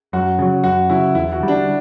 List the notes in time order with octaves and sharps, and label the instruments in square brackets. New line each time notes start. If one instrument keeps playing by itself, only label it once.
[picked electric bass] F#2 [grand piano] F#4
[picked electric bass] C#3 F#3
[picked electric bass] F#2 [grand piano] F#4
[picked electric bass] C#3 F#3 [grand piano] E4
[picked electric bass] E2 [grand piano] E4
[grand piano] F#4
[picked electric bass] D3 G3
[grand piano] D4